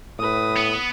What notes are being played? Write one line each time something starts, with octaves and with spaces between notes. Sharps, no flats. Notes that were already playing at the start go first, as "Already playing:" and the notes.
A2 B4 D#6
B3